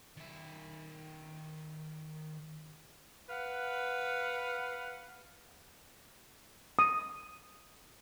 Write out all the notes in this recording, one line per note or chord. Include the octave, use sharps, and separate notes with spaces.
D#3 E5
B4 F5 F#5
D#6